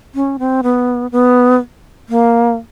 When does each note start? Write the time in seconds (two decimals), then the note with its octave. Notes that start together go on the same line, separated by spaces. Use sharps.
0.15 C#4
0.39 C4
0.63 B3
1.12 B3
2.09 A#3